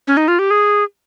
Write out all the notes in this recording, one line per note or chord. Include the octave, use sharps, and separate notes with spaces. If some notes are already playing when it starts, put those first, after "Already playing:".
C#4
D#4
F4
G4
G#4